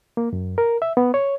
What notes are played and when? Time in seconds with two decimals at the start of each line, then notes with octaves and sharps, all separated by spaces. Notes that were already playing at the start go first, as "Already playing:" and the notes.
0.17 A#3
0.33 F#2
0.58 A#4
0.82 E5
0.97 B3
1.14 C#5